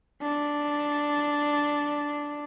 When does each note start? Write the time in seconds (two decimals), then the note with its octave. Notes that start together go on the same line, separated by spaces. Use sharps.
0.22 D4